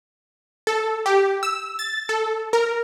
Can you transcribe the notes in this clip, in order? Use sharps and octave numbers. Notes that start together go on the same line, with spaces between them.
A4
G4
E6
A6
A4
A#4